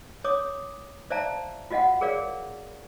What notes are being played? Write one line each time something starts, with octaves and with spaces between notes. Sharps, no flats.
C#5 D6 D#6
C5 D5 E5 F5 A5 A#5
F4 F#4 D#5 F5 F#5
G#4 A#4 C#5 D5 F5